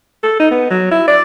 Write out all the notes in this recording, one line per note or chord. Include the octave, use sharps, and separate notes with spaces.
A4
D#4
B3
F#3
E4
D5